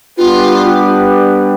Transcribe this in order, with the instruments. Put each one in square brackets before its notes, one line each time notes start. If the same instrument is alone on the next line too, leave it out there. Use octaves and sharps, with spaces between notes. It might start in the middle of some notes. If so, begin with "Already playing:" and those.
[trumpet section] G3 B3 D4 G4 B4 [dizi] F4